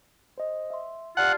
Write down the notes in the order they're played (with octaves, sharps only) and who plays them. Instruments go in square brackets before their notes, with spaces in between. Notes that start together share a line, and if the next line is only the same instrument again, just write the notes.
[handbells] C5 D#5
E5 C6
[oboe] F4 [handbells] G4 D5 A5 [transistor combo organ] F#5